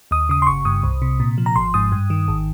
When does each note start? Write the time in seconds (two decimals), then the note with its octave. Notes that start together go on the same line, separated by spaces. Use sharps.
0.11 D#2 D#6
0.29 C#3 D#6
0.42 C6
0.47 G1 C#6
0.65 G2 D#6
0.83 C2
1.02 C3
1.20 A#2
1.38 F3
1.46 A#5
1.56 G#1 C6
1.74 G#2 D#6
1.92 G2
2.10 D#3
2.28 G#1